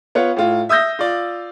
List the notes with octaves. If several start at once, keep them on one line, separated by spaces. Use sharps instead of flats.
B3 F4 C#5 F#5
A2 F4
E5 D#6 E6 G6 A#6
F4 D5